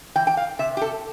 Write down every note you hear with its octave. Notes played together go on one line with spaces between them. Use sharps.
E3 G5
G5
F5
C3 E5
G4
A4